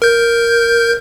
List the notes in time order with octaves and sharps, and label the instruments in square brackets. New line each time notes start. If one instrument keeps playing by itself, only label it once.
[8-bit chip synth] A#4 G6